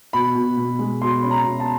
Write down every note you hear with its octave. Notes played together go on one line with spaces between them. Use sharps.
B2 B5
B2
B2
G#3
B2 C6
C#4 B5
A#5
B2
A5